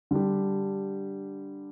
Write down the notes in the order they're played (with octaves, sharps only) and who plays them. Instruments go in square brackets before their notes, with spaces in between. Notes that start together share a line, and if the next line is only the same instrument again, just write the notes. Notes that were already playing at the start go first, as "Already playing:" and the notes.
[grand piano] D3 G3 D4 G4